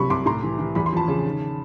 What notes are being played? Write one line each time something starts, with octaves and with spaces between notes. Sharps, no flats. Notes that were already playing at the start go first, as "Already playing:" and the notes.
Already playing: C2 C3 F#3 B5 C#6
C2 C6 D6
A2 A#5 C6
E3
E3
E2 B5
C6
F3 A5 B5
C#3
D#3